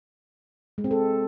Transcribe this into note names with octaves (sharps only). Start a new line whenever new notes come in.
G#3
C4
A4